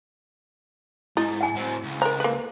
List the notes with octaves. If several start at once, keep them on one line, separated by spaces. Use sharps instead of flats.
G#2 D#4 E4
F#5 G#5
A2 C4
C#2
A#4 C5 A#5
A#3 B4